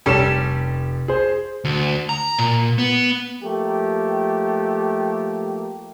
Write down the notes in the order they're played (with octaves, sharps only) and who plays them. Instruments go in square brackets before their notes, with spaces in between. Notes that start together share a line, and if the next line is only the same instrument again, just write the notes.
[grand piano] F1 E7 [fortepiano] G3 C#4 A4
[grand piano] G#4 C5
[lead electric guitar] D2
A#5
A#2
B3
[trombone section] F3 A3 A#3 G4